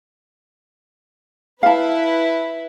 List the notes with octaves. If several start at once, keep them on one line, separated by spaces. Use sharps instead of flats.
E4 B4 F5 A5